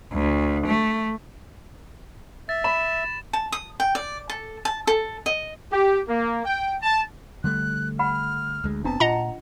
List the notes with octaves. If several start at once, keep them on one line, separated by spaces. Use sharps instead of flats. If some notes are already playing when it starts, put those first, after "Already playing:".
D2
A3
E5 A6
B5 E7
A5
D#6
G5
D5
A4
A5
A4
D#5
G4
A#3
G5
A5
D3 G3 A3 F#6
F#5 G5 B5 F6
D2 G#3
F1 B3 C4 D4 A5 A#5
A#2 F4 D#5 F#5 A#5